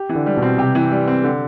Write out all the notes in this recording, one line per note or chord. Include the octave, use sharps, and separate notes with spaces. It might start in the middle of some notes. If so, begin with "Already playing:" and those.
Already playing: G4
E3
D3
G3
B2 C4
C3 G4
E3
G3
C4
D3